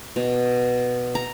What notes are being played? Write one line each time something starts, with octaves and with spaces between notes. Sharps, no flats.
B2
A#5